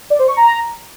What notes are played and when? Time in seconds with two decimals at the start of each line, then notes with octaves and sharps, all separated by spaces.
0.10 D5
0.19 C5
0.28 C#6
0.37 A#5